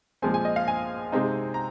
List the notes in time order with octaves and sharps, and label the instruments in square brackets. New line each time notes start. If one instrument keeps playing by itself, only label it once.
[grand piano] A#2 F3 G#3 C4 G#5
G#5
D#5
F5
G#5
C3 G#3 C4 D#4
A#5